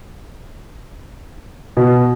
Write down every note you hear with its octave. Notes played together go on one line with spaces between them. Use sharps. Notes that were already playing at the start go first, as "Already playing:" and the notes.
B2